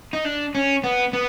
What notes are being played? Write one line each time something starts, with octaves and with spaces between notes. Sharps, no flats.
D#4
D4
C#4
B3
B3